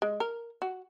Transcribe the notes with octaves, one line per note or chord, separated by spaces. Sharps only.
G#3
A#4
F#4